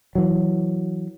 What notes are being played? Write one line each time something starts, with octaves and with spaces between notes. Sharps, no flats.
E3 F#3